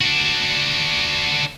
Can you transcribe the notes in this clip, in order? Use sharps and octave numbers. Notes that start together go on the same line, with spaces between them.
D4 F#4